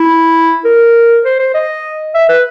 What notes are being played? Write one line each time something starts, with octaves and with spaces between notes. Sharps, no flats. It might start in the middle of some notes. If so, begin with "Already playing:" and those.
Already playing: E4
A#4
C5
C5
D#5
E5
B4